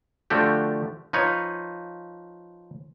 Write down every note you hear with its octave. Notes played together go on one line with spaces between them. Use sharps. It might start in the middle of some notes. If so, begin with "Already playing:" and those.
D3 F3 A3 F#4 G4
F3 D#4 B4 C#5